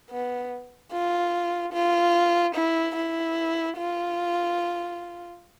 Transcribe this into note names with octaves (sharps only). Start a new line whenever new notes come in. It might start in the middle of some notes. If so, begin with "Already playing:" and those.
B3
F4
F4
E4
E4
F4